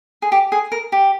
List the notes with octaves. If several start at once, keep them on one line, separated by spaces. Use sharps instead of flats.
G#4
G4
G#4
A#4
G4